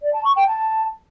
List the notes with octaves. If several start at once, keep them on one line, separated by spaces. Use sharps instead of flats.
D5
A5
C#6
G5
A5